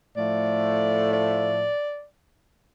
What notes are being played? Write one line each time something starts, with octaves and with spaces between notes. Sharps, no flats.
A2 F3 A3 D5
D5